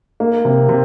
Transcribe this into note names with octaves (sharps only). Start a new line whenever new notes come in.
A#3
C3
C3